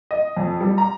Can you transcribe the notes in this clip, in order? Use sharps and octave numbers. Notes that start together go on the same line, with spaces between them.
D#5
F2
G3
A#5